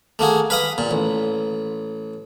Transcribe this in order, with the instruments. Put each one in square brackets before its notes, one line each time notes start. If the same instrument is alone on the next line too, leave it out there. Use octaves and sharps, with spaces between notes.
[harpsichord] A3 A#3 F#4 G#4
B4 F5 B5 D#6
A#2
A1